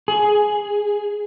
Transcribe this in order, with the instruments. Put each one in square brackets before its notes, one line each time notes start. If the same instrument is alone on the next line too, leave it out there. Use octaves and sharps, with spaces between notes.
[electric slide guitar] G#4